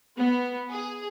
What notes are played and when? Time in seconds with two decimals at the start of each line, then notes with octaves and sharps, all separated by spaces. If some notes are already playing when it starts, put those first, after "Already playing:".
0.16 B3
0.69 G#4